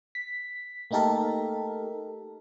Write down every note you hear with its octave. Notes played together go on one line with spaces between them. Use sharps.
B6
A3 A#3 D#4 G4 A4 A#4